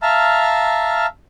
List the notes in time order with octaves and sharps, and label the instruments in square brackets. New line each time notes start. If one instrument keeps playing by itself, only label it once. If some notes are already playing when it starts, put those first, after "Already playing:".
[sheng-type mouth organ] E5 F5 A5 A#5 F6